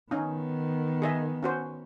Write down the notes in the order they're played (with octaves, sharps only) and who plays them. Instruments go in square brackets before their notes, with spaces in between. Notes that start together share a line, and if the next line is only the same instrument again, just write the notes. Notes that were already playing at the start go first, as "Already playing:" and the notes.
[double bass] D#3 B3 [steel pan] C#4 D#4
[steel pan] G#4 D#5 E5
C#4 F#4 C5